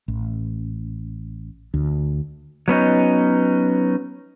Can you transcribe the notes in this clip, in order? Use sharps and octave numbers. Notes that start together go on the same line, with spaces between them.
A1
D2
F#3 B3 C#4 D#4